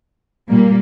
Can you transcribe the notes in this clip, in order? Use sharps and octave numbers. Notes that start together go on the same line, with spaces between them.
A#2 G3 A#3